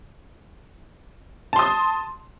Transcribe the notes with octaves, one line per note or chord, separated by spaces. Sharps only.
A5 C6 D#6